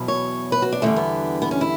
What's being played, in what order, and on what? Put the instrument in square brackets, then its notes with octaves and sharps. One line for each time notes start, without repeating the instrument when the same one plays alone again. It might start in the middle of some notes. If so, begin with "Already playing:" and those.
Already playing: [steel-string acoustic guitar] E2 B2 F#3
C#5
B4
F#4
D4
E2 D3 G3 A3
B3
B3
C#4
E4